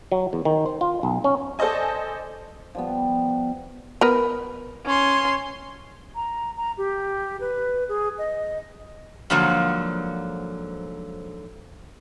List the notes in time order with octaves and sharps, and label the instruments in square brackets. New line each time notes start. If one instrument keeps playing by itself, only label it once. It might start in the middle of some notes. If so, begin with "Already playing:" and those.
[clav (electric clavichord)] F#3
E2
D#3
C5
F4
B1
C#4
[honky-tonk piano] A4 C5 D5 D#5 G#5
[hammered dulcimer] F3 G3 B3
[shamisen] B3 A#4 B4
[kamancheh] C#4 C6
[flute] A#5
A#5
G4
B4
G#4
D#5
[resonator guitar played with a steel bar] G#2 D3 F3 F#3 A#3